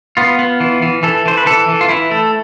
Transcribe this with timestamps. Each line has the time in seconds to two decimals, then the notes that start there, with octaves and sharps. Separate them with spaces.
0.17 B3 F4
0.39 B3
0.60 E3
0.82 E3
1.03 E3 A4
1.26 E3 C5
1.38 B4
1.46 E3 A4
1.68 E3
1.81 F4
1.89 E3 E4
2.11 A3 A4